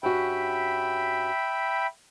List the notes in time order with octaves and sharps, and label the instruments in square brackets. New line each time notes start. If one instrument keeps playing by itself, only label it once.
[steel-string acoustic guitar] G2 C#4 F#4 [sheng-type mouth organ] E5 G5 B5